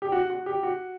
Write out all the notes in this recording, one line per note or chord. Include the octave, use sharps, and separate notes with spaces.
G4
F#4
F#4
G4
F#4